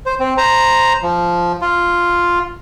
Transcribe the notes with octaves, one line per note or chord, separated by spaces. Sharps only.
C5
C4
C5 A#5
F3
F4